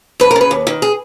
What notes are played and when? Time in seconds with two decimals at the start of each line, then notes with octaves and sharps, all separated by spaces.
0.20 F2 B4
0.31 A#4
0.36 C#3
0.41 B4
0.51 D#2
0.67 D#3
0.82 G#4